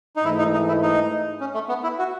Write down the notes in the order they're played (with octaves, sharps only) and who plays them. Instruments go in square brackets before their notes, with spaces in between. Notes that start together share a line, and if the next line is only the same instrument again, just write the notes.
[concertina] D#4
[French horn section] G#2 E3 A3 [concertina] E4
[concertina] D#4
D#4
E4
D#4
C#4
A3
B3
E4
F#4